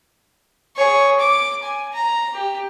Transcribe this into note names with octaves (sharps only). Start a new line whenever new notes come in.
G#4 C#5
D6
G#5
A#5
G4